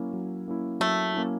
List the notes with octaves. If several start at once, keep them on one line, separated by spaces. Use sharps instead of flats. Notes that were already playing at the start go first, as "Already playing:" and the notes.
Already playing: F#3 A#3 C#4 E4
F#3
A#3 C#4 E4
F#3 A3
A#3 C#4 E4